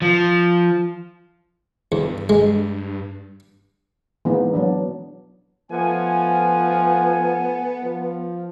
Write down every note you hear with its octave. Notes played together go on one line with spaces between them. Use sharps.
F3
E2 G2
G#3
E3 G#3 A#3 B3 D#4
F#3 B3 D4
F3 A3 B3 F#5 G#5
F3